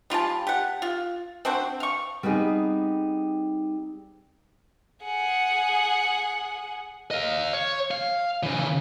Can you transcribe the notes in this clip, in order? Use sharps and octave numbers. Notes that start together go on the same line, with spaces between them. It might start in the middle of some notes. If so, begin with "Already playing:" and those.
G3 F4 G4 A5
G4 F#5
F4
C4 D4 F#4 C5
F5 C#6
G3 B3 C4 D#4 G#4
G#4 F#5
D#5 F5
C#5
F5
C#3 E3